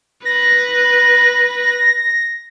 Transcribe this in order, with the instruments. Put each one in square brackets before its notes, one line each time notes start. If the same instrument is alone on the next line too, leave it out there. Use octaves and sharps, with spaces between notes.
[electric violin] B4 [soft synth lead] A#6